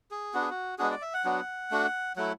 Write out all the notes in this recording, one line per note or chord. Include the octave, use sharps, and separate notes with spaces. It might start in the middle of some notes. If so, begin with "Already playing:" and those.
G#4
B3 D4 F#4
G#4
F#4
G#3 B3 D4 F#4 G#4
D5
E5
F#5
F#3 B3 D4 F#4
A3 D4 F#4
F#3 A3 E4 F#5